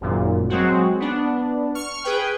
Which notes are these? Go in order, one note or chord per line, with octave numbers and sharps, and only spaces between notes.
G#1 F#2 A#2
F#3 G#3 C4 F#4
B3 D4
C#6 F6 C#7
G#4 B4 G5